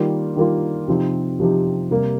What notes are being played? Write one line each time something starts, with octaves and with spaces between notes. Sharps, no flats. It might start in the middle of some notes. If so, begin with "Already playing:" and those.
Already playing: D#3 G3 A#3 F4
D#3 G3 A#3 F4
C3 F3 C4 D#4 G4
C3 F3 C4 D#4 G4
C3 G3 A#3